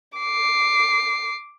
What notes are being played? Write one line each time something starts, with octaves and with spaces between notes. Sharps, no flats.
D6 C7